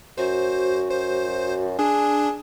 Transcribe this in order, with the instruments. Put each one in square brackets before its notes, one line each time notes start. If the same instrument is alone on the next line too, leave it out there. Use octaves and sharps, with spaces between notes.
[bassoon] F#2 [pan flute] F#4 [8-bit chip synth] C5
[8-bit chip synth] C5
[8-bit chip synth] D4 [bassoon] G#4